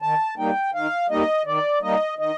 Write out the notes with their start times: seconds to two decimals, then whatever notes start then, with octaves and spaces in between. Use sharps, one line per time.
0.02 D#3 A5
0.38 G3 A#3 D#4 G5
0.74 D#3 F5
1.10 G3 A#3 D#4 D#5
1.46 D#3 D5
1.82 G3 A#3 D#4 D#5
2.19 D#3 D#5